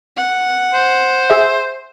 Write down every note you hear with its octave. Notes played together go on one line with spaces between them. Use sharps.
F#5
C5
G#4 E5